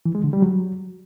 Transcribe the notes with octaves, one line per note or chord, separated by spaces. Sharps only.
E3
G#3
D3
G3
F#3